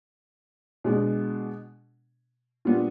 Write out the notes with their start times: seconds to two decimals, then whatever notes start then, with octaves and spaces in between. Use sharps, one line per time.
0.84 B2 G#3 B3 D4
2.65 A#2 G3 B3 D4 F4